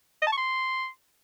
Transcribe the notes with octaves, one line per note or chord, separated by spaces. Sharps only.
D#5
A5
C#6
C6